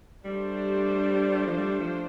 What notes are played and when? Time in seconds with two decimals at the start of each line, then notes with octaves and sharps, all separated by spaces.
0.25 G3 A3 D4 G4 C5
1.47 F3
1.58 G3
1.80 F3